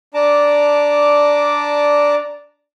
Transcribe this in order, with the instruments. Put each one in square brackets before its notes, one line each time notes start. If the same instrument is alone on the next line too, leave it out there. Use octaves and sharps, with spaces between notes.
[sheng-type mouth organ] D4 D5 A5 A#5 D6